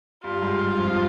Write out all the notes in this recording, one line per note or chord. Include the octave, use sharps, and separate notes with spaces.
G2 G3 F4
G3
G#2 G#3
G2 G3
F2 F3